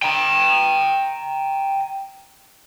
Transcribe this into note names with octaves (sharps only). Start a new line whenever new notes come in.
G5 A#5